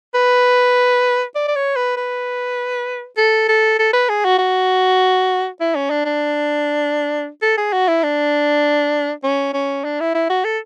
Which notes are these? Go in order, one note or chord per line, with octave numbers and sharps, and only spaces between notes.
B4
D5
D5
C#5
B4
B4
A4
A4
A4
B4
G#4
F#4
F#4
E4
C#4
D4
D4
A4
G#4
F#4
E4
D4
C#4
C#4
D4
E4
E4
F#4
A4